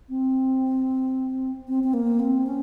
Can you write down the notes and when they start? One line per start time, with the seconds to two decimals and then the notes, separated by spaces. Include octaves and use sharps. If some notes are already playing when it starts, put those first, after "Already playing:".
0.09 C4
1.68 C4
1.84 C4
1.94 A#3
2.20 C4
2.47 C#4